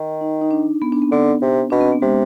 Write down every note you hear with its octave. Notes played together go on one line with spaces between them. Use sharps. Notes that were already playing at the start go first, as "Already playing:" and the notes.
Already playing: D#3
D#4
D#4
D4
B3
D4
C4
D3 B3
C3
B2 D4
C4
B3
C3 G#3